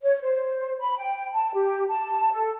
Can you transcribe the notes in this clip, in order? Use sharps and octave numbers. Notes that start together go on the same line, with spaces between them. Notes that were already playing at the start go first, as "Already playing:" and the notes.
C#5
C5
B5
G5
A5
G4
A5
A4